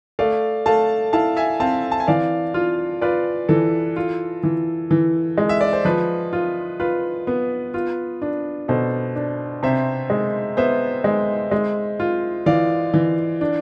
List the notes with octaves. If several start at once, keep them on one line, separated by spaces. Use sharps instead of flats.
A3 D5 F5
A3 F5 A5
E4 F5 A5
E5 G#5
C4 F5 A5
A5
G#5
E3 D5 F5
F4
F4 B4 D5
E3 A4
F4
E3
E3
G#3
E5
D5
C5
F3 B4
F4
F4 B4
B3
F4
D4
B2 A4 C5
D4
C3 C5 E5
G#3
B3 C5 E5
G#3
G#3
F4
E3 D5 F5
E3
D4